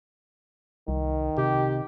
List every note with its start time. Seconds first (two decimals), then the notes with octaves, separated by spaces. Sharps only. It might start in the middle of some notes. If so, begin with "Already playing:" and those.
0.88 C2 D#3
1.38 C3 G4